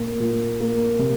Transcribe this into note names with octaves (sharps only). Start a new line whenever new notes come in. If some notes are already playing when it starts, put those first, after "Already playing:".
Already playing: A#2 A#3
A#2
A#3
C3